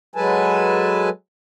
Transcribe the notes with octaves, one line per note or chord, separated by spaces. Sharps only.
F#3 G#3 A4 B4 G#5 A5